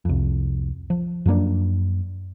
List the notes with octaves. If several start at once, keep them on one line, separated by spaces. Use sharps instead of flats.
C2 F2
F3
F#2 F3 A#3 D4